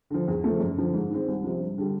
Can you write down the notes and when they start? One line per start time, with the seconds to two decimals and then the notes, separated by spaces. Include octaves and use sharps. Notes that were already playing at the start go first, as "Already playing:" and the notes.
0.10 D3 F3
0.28 E2
0.44 C#3 F3 A3
0.60 F#2
0.78 D3 F3
0.94 G#2
1.10 D#3 G#3 C4
1.28 C2
1.44 C3 F3
1.60 G2
1.78 D3 G3